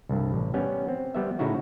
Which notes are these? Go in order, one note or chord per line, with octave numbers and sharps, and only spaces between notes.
C2 G2
A1
G3 B3 C#4
C4
G3 B3 E5
A2 C#3 D#4 E4 F#4